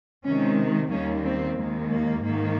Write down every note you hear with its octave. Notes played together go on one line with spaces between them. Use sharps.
C3 D#3 G#3 C#4
D#2 D#3 G3 A#3 C#4
C4
D#2 D#3 G#3
A#3
G#2 D#3 A#3